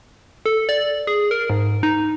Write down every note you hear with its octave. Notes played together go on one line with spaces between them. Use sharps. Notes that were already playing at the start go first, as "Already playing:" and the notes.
A4
D5
G#4
A#4
G#2
D#4